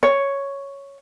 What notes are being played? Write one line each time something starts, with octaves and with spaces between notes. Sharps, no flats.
C#5